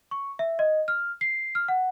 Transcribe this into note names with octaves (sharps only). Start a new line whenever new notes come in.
C#6
E5
D#5
F6
C7
F6
F#5